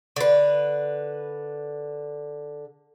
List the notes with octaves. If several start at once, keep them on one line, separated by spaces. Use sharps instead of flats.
D3 B4